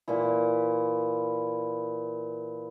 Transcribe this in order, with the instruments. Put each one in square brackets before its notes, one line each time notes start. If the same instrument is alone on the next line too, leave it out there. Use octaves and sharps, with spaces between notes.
[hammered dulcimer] A#2 E3 E4